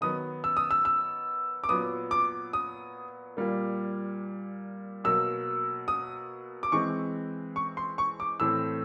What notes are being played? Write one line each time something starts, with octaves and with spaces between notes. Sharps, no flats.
D#3 F#3 B3 D#6
E6
D#6
E6
E6
D6
A#2 F#3 B3 D#6
D6
D#6
A#2 G3 A#3
B2 F#3 A#3 E6
D#6
D6
E3 G#3 C4 C#6
C#6
C6
C#6
D6
A2 E3 A3 C4 E6